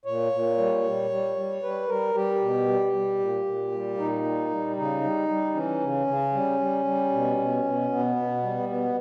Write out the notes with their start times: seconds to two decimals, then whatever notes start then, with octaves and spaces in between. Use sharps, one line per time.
0.05 A#2 C#5
0.32 A#2
0.57 G3
0.84 G3
1.10 G3
1.37 G3
1.62 G3 B4
1.89 G3 A#4
2.14 G3 G4
2.41 B2
2.67 G3
2.93 G3
3.20 A#2
3.46 A#2
3.72 G3
3.98 A#2 D#4
4.24 G3
4.51 G3
4.76 C#3 D#4
5.03 G3
5.29 G3
5.54 E3 C#4
5.81 C#3
6.07 C#3
6.33 G3
6.60 G3
6.85 G3
7.12 B2
7.38 B2
7.64 B2
7.90 B2 B3
8.16 B2
8.42 G3
8.68 B2 B3